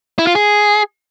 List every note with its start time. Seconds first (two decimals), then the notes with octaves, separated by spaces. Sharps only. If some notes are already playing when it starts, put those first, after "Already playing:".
0.19 E4
0.27 F4
0.35 G#4